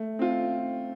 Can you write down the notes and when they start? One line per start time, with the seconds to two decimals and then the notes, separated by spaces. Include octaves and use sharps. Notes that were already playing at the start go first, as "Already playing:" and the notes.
Already playing: A3
0.19 C4 F4